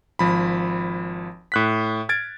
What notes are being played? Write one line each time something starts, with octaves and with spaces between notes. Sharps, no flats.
G#1 F3 B5
A2 F#6 B6
F6 G#6 A6 D7